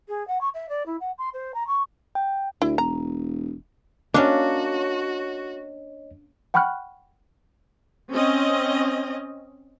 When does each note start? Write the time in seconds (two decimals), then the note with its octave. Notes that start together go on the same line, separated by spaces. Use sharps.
0.08 G#4
0.27 F#5
0.41 C#6
0.54 E5
0.69 D5
0.86 E4
1.00 F#5
1.18 C6
1.33 C5
1.54 A#5
1.67 C#6
2.15 G5
2.62 D2 E4
2.78 E1 A#5
4.14 A#3 C#4 D4 F#4 C#5 D#5
6.54 F#5 G5 B5 C#6 F6 F#6
8.12 C4 C#4 D#5